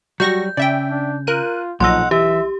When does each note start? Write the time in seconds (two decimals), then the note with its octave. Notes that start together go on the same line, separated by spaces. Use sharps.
0.20 F#3 G3 F#4 C#6 G6 A#6
0.57 C#3 D5 E5 G5
0.90 D4
1.27 F4 A#4 F#6 D#7
1.80 B1 A#2 F3 D#5 F#5 C6 E6
2.11 E3 G4 E5